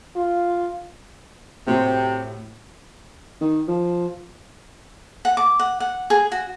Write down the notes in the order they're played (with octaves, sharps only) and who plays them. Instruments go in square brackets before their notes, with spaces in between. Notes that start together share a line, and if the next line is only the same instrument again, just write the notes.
[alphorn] F4
[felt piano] A2 F#4 [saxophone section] C3
[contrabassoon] D#3
F3
[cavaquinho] F#5
D6
F#5
F#5
G#4
F#4